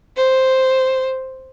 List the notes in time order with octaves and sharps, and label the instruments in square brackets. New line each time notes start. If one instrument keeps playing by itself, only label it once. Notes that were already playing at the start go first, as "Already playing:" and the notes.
[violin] C5